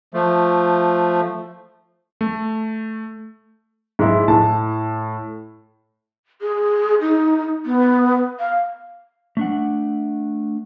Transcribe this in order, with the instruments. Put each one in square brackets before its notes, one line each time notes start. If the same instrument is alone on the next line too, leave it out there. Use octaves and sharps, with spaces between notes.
[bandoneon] F3 A3
[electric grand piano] A3
[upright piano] G#2 E4
A2 A5
[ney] G#4
D#4
B3
F5
[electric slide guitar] A3 D4 F#5